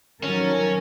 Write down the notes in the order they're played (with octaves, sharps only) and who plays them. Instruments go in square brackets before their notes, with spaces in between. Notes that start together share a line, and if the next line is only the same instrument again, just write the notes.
[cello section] D#3 A4 A#4 [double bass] F#3 [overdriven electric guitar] C#4